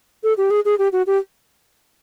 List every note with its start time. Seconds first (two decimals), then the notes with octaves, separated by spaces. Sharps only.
0.24 A4
0.38 G4
0.51 G#4
0.65 G#4
0.79 G4
0.93 F#4
1.07 G4